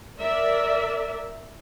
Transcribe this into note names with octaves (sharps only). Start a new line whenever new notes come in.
A#4 D5 E5